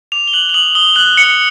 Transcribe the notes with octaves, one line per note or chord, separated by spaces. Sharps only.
D6 F7
G7
F#6 F#7
F7
D#6 F#7
D#6 G7
F#6 F#7
F#6 C#7